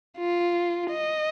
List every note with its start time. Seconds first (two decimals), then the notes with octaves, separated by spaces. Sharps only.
0.18 F4
0.91 D#5